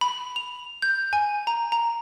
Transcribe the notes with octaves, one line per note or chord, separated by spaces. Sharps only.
B5
F7
G6
G#5
A#5
A#5